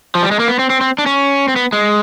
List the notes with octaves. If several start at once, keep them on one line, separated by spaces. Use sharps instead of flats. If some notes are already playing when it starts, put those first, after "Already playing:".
F3
G3
G#3
A#3
B3
C4
C4
C4
D4
C#4
C4
B3
G#3